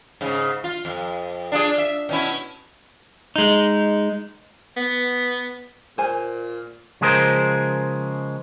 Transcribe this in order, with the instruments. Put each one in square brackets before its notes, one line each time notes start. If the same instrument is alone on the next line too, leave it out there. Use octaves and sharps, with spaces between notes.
[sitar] G#2 C#3
F4
F2
D4 F4 G#4
E5
B2 C#4 E4
[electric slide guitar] G#3 D#4
[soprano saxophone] B3
[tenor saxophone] A#2 [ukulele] C5 G#5
[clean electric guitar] C#3 F3 G#3 G#4 A#4 C5